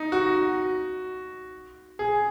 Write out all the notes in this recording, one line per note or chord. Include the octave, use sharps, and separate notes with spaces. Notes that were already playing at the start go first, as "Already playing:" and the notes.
Already playing: D#4
F#4
G#4